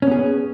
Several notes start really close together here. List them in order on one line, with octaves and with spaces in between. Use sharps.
C#4 B3 G#4